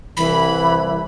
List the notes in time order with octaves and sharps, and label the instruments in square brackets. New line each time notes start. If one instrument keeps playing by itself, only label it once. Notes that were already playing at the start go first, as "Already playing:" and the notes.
[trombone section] C2 [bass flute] E3 [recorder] B5